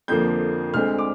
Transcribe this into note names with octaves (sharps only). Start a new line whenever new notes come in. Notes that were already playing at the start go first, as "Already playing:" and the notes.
F2 D3 F3 A#3 G6
D2 D3 G#3 C4 F6
D6